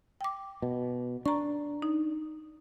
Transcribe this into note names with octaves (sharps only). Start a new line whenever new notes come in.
G5 D6
B2
D4 A#5 C#6
D#4